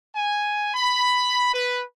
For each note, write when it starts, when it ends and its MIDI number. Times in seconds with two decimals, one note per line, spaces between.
0.15 0.68 80
0.74 1.49 83
1.54 1.81 71